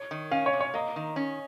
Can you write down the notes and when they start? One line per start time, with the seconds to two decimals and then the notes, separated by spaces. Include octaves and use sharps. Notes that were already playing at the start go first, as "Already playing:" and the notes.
Already playing: C#5
0.11 D#3
0.31 C#4 F5
0.46 C#5
0.53 C3
0.61 C#5
0.74 A#3 D#5
0.96 D#3
1.16 C#4